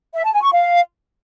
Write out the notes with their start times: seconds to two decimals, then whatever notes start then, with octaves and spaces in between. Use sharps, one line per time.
0.15 E5
0.24 A5
0.33 G#5
0.42 C#6
0.52 F5